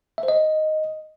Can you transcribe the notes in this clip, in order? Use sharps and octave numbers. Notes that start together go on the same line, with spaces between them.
E5
C5
D#5